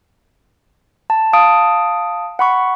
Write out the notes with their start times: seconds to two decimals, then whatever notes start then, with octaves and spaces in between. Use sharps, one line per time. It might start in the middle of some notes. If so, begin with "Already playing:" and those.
1.10 A5
1.33 F5 A5 D#6 D7
2.39 F#5 B5 C#6